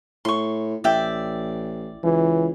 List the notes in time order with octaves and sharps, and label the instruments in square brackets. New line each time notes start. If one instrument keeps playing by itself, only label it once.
[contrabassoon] A2 [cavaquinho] C6 C#6
[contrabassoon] A1 [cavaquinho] D5 E5 G5
[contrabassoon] C#2 [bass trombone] E3